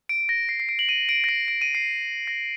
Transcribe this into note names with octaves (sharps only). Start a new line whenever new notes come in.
D7
A#6
C7
C7
D7
F#7
D#7
D7
A#6
C7
D7
D#7
C7
A#6